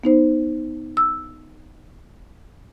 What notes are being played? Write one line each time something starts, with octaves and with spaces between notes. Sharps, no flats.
B3 D#4 C5
E6